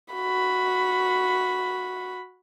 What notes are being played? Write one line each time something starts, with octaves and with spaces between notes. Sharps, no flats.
F#4 B5